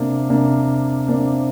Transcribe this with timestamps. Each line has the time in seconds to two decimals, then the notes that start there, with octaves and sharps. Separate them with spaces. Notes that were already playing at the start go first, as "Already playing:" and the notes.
Already playing: C3 A#3 D4
0.30 C3 A#3 D4
1.08 C3 A#3 D4